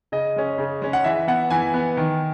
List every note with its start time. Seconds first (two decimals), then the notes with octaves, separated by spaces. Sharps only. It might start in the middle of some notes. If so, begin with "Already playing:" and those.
0.12 C#3 D#5
0.36 G#3 C#4
0.58 C#3
0.82 G#3 C#4
0.93 F#5
1.04 E3 E5
1.28 B3 F#5
1.50 E3 G#5
1.74 B3
1.97 D#3